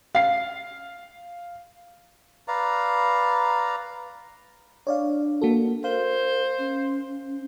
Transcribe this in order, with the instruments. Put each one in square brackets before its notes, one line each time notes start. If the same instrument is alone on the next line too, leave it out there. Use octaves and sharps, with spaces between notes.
[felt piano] F5 C7
[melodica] B4 D5 F5 A#5
[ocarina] D4 [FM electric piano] C#5 D5 F5
[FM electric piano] A#3 F#4 A4
[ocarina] A#4 [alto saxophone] C5 [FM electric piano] F5
[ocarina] C#4